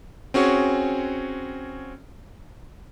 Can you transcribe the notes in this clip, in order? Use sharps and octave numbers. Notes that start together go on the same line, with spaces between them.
C4 C#4 F#4 G#4 C#5